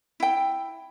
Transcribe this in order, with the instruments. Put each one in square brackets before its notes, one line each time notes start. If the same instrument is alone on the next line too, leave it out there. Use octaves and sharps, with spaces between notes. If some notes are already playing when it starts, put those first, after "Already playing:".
[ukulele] E4 G5